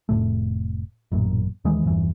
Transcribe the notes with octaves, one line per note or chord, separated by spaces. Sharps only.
F1 F2 A2 A3
A1 F#2 A#2
D#2 D#3 E3 G#3
G1 E2 G2 E3